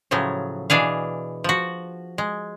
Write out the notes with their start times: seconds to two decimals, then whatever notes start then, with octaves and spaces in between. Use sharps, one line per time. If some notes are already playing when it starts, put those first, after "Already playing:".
0.11 A2 C#3 F3 F#3
0.70 B2 E3 D4 G#4 F5
1.44 F3 F#4
2.18 G#3